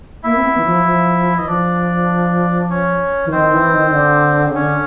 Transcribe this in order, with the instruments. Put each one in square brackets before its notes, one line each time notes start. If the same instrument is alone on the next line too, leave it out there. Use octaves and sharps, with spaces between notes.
[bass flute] A#3 [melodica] E4 E5
[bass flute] C4
B3
E3
F3
F3
[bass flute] E3 [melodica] D#5
[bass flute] F3 [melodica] D4 D5
[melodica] C#4 C#5
[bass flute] E3
[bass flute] D#3 [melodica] C4 C5
[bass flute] E3
D#3
D#3
D3
C#3
[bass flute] D3 [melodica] C#4 C#5